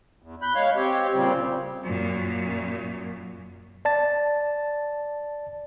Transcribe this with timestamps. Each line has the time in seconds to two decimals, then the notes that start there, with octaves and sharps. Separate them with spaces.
0.22 E2
0.42 B5 F#6 G6
0.55 G#3 C#5 F5
0.76 C4 G4 C#5
1.14 A#2 C#3 G3 C4
1.84 F#2 A#2
3.85 D5 A5 A6